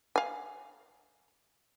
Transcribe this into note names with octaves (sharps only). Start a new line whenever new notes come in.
F5 G#5